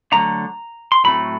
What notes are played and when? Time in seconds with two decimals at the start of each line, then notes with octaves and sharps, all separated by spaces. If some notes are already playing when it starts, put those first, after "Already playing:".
0.12 D3 F#3 A3 D4 A#5
0.92 C6
1.04 A2 F#3 A3 C4 B5